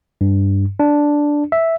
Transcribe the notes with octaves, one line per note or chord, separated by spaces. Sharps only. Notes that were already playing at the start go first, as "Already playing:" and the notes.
G2
D4
E5